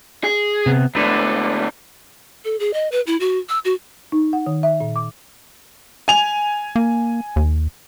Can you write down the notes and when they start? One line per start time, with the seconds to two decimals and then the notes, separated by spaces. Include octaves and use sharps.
0.24 G#4
0.66 C3 B3
0.95 G#2 D3 A3 B4
2.45 A4
2.60 G#4
2.73 D#5
2.92 B4
3.07 E4
3.20 F#4
3.49 E6
3.65 F#4
4.12 D#4
4.33 F#5
4.46 D#3
4.63 E5
4.81 A#2
4.96 D6
6.08 G#5 F7
6.76 A#3
7.36 D#2